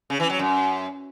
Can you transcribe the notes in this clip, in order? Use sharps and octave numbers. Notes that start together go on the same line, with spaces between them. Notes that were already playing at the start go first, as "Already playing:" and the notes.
C#3
E3
F#3
F#2